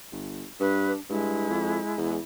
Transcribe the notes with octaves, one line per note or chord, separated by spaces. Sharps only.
G1
G2 D4 B4
G2 G#3 E4
F2
E2